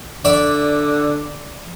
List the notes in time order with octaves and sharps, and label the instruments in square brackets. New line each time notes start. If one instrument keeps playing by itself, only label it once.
[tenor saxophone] D3 [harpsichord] D5 E5 D6